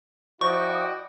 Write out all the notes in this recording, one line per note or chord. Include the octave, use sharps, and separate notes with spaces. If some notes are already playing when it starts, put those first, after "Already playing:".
F3 E4 F#4 D5 D#5 G5 C#6